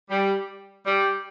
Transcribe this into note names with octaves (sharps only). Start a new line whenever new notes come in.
G3
G3